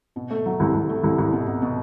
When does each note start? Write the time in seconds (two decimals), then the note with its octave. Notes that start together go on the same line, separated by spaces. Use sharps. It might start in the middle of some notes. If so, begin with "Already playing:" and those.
0.16 B2
0.31 A3
0.46 F#3
0.60 C2
0.75 C2
0.89 A3
1.04 C2
1.18 C2
1.33 B2
1.47 B2
1.62 B2